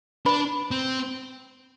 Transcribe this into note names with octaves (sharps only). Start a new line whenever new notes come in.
D4 B4 B5
C4